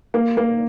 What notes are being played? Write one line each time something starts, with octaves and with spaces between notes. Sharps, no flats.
A#3
A#3